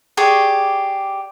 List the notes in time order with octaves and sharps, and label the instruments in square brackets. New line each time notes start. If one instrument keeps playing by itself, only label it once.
[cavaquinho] G4 G#4 D5 C#6